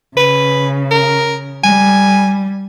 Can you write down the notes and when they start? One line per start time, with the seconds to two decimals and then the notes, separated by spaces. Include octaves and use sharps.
0.17 C#3 B4
0.91 A#4
1.64 G3 G#5